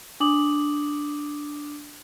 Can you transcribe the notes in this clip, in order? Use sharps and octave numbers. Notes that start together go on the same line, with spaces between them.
D4 D6 D#6 F#7